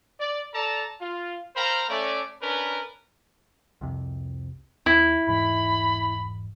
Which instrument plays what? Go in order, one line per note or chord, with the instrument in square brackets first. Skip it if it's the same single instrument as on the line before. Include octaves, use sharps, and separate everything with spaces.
[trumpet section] D5
A4 D5 A5 A#5
F4
A#4 C5 F5 G5 A#5 B5
A3 C#4 D5
C#4 D4 A#4 B4
[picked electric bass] C2 F2 C3
[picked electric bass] D#2 [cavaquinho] E4
[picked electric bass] E1 G#2 E3 [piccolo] B5